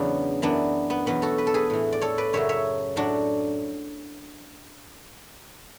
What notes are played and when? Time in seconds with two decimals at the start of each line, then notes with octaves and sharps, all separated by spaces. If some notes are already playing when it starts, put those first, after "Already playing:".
Already playing: E2 C#3 F#3 B3 D4
0.42 F#2 E3 B3 D4
0.90 B3
1.06 E2 B2 F#3 B3
1.22 F#4 A4
1.38 B4
1.47 A4
1.54 G#4 B4
1.70 A2 E3
1.92 D5
2.01 A4 C#5
2.18 B4 D5
2.33 F#2 C#3 F#3 C#5 E5
2.49 C#5 E5
2.96 A2 F#3 D4 F#4